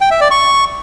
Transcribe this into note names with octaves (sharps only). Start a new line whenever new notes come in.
G5
E5
D5
C#6